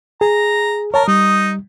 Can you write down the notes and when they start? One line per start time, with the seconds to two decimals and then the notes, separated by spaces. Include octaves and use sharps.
0.21 G#4 A#5
0.94 A#4 C#5 A5
1.08 G3 D#4 D#6